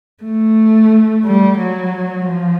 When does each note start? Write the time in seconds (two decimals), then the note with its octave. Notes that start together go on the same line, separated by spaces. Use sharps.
0.24 A3
1.25 G3
1.58 F#3
2.26 F3